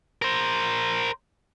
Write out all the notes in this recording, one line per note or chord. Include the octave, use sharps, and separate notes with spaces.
A#4 C5